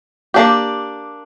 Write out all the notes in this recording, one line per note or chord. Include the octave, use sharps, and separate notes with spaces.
A#3 D4 G4